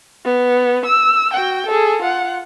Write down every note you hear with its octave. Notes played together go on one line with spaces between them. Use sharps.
B3
E6
F#4 G5
G#4 A4
F4 F#5